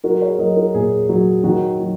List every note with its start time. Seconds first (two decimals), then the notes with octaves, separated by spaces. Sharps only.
0.04 F#3 F#4 A#4
0.14 A#4
0.21 G#4 C#5
0.38 F#3 A#4 D#5
0.56 F#4 A#4
0.74 A#2 G#4
1.09 F#3
1.44 D#3 F#4
1.79 F#3